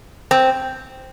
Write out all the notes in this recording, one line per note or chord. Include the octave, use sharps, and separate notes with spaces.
C4